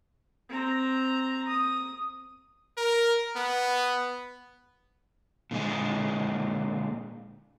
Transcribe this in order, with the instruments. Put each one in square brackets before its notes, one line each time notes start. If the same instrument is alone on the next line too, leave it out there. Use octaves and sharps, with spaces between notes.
[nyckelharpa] C4 A#5
D#6
[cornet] A#4
B3
[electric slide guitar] A#2 D3 G#3 G#4